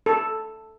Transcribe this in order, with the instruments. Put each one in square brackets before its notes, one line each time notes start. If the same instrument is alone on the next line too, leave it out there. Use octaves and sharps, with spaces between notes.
[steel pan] A4